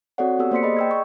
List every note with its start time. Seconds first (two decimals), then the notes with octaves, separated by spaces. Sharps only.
0.18 C4 F#4 A4 C#5 D5 F#5
0.39 B3 G4 A4 E6
0.51 A#3 C5 D5 C6 B6 C#7
0.63 G#4 D5 D#5 B5
0.77 G5 E6 G#6
0.91 C#6